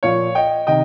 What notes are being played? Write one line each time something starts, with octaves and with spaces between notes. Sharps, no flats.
A#2 F3 C#5 F5
D#5 G5
C3 D#3 D#5 G5